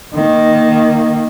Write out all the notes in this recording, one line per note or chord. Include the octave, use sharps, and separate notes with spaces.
D#3 A#3